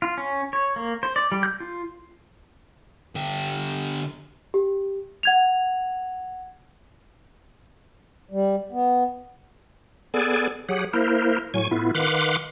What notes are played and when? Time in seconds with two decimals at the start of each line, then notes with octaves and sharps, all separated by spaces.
0.02 F4
0.17 C#4
0.53 C#5
0.76 A#3
1.03 C5
1.16 D5
1.32 G3
1.43 G6
1.60 F4
3.15 D3 G4
4.54 G4
5.23 F#5 G#6 F7
8.31 G3
8.71 B3
10.14 B3 G#4 A4 D5 G#5
10.69 F#3 G4 G#4 F#5
10.93 A#3 E4 A#4 C5
11.54 A2 F#3 G#5 C#6
11.71 A2 B3 E4 F4
11.95 D#3 B4 F5 F#5 C6 D6